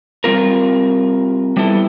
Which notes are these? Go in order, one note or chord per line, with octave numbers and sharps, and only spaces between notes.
G3 C4 F4 A#4
G3 B3 E4 A4